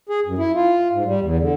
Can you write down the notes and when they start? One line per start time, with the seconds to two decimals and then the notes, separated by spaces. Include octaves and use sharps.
0.09 G#4
0.26 F#2
0.38 E4
0.54 F4
0.92 G#2
1.05 G3
1.20 E2
1.40 D3